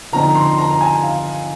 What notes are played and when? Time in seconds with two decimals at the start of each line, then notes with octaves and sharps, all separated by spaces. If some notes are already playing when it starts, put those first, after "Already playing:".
0.12 D3 F3 C4 D#4 A#5
0.35 C6
0.58 A#5
0.71 A#5
0.81 G#5
1.03 F5